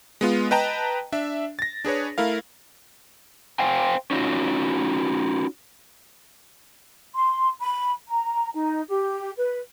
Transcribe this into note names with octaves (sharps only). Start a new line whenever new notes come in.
G#3 B3 F4
B4 D#5 G5 A5 A#5
D4 E5
A6 A#6
D4 G#4 B4 C#5
A3 E4 A#4 F5
C5 F5 G5 G#5
C#4 D#4 F4 F#4
C6
B5
A#5
D#4
G4
B4